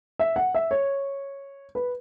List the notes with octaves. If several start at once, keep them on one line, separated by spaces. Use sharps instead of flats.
E5
F#5
E5
C#5
B4